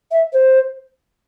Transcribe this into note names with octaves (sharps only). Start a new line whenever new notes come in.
E5
C5